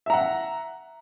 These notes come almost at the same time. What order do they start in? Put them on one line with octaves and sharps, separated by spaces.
E5 A#5 F#5